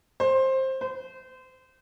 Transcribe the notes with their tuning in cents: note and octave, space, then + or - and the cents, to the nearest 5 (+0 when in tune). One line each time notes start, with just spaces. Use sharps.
C5 +15
C5 -30